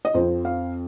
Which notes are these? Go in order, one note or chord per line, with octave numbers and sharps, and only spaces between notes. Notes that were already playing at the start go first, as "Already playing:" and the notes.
D#5
F2 F3 C4 C5
F5